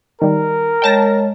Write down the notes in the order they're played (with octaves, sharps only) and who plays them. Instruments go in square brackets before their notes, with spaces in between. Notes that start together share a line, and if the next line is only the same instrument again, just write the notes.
[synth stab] D#3 G3 [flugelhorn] A#4
[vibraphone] G#3 C#5 D#5 [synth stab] G5 A5 A#6